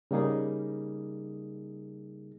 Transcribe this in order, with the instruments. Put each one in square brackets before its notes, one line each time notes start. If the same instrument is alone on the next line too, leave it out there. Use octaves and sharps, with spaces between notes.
[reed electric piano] C#3 G3 A#3 D#4 G#4